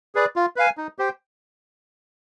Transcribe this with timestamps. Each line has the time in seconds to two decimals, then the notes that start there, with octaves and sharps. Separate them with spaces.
0.15 G#4 B4 D5
0.36 F4
0.56 B4 F5 G#5
0.77 D#4
0.98 G4 C5 G5